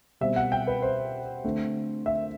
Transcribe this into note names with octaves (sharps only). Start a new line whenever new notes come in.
B2 G3 C4 E5
F#5
G5
B4
C5
D3 A3 C4
E5